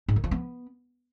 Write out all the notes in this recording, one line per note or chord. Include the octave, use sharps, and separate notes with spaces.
G#2
D#3
F3
B3